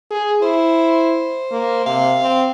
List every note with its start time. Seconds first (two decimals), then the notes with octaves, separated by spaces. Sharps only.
0.11 G#4
0.42 E4 C5
1.52 A#3
1.86 C3 F5
2.22 C4